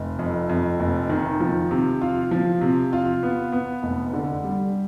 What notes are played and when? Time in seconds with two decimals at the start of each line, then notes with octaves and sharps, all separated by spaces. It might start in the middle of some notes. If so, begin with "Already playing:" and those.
Already playing: F1
0.19 F2
0.49 F2
0.80 F1
1.09 D#3
1.40 F3
1.71 C3
2.01 F4
2.31 F3
2.61 C3
2.93 F4
3.23 B3
3.52 B3
3.83 F1
4.13 D3
4.44 G3